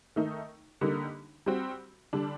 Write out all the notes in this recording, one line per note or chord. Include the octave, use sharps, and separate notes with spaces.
D#3 A3 D#4
D3 G3 A#3 D#4
G3 C4 F#4
D3 G3 D4